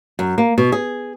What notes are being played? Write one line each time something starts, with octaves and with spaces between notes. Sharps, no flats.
F#2
A#3
B2
G#4